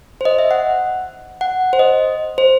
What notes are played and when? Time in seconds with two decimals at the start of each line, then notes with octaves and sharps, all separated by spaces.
0.21 C5
0.25 D#5
0.39 E5
0.51 F#5
1.41 F#5
1.73 C5
1.79 D#5
2.38 C5